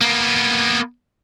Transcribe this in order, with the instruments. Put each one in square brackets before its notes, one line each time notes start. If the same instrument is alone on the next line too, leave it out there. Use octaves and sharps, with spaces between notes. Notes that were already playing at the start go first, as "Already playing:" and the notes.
[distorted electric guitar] A#3 B3